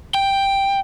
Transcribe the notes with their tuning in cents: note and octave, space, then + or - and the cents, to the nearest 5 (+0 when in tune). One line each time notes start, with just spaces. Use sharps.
G5 +5